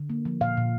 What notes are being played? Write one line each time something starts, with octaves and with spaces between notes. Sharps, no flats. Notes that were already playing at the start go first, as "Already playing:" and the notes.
Already playing: D3
A#3
F3
A#2 F5
A#2